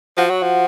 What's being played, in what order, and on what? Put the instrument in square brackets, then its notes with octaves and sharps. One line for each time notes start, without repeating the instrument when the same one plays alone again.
[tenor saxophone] F3 [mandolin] F#4
[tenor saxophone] F#3
F3